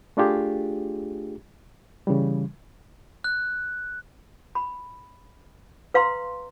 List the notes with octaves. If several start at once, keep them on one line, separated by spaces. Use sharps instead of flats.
A3 D4 F4 G4 G#4
C#3 E3 G3
F#6
B5
B4 F5 A#5 C6